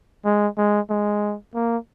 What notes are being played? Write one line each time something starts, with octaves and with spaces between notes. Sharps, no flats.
G#3
G#3
G#3
A#3